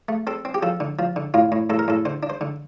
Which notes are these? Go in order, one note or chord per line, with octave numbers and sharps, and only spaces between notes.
A3
C4 A4
C4
G4
F3 A4
D3
F3
D3
A2 F4
A2
A2 A4
A#4
A2 A4
D3 C5
D4
C5
D3